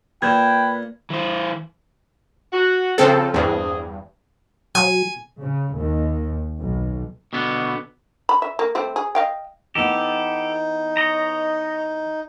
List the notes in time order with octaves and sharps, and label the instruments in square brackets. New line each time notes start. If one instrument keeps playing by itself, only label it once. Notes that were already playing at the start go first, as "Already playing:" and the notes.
[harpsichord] A#2 [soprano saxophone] B4 [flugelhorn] G5 [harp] G#6 E7
[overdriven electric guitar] E3 C5
[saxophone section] F#4
[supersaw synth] C#3 C4 A4 [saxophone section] F3
[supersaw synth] E2 G2 [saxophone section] C4 G#4
[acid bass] F#3 [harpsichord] G#5
[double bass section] C#3
D#2
B1
[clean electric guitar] B2 D3 B3
[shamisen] B5
E5
A#3
G3 A3 C4
G#4
D#5 F5 G5
[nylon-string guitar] E3 B3 [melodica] D#4 [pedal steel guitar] G4 A4
[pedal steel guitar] C#5 D#5 A#5